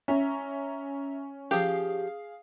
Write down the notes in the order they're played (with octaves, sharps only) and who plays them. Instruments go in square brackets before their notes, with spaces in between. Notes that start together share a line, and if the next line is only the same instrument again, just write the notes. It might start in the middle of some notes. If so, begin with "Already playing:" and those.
[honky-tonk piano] C#4 [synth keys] E5 A#5
[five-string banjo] F3 G4 [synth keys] G#4 F5